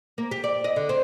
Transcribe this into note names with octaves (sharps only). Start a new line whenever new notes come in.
A#3
G4
D5
D#5
D3
C4